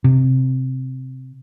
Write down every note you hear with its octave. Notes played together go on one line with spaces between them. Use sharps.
C3